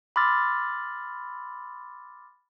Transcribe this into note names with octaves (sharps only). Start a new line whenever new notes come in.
B5 C6 D6 E6 F6 A6